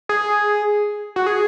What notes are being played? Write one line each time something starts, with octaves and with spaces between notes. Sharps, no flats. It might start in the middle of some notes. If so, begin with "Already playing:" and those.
G#4
F#4
G#4